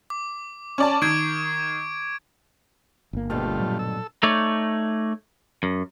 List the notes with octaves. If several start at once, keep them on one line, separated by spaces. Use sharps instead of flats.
D6
C#4 D5 A5 C#6
D#3 D6 G#6 D7
G1 A#3
D2 G2 B2 G3 A3 F4
A#2 F#3
A4 E6
A3 D#4 C#5 D5
F#2